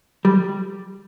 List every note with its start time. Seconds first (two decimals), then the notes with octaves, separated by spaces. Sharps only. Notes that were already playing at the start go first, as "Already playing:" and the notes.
0.25 G3